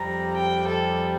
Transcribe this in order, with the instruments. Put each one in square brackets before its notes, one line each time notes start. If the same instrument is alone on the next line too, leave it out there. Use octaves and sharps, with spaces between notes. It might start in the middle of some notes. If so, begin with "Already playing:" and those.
Already playing: [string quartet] F2 C3 G3 A#5
G5
A4